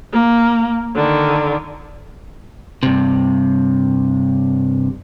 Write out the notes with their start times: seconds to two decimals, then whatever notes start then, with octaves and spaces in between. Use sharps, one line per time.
0.13 A#3
0.95 D3 D#3
2.83 G2 C3